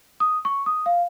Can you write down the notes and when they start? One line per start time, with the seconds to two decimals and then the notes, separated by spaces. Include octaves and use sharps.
0.20 D#6
0.45 C#6
0.66 D#6
0.86 F5